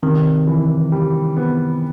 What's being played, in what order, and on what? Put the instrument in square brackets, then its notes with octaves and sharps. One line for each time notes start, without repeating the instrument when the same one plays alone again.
[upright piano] C3 [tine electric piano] D#3
[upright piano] E3
G3
B3